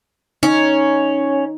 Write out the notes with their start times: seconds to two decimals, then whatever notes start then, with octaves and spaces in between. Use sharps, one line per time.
0.43 C#4 D#4